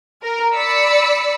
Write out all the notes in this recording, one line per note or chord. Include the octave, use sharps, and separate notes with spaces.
A#4
D5 B5 E6 B6 C#7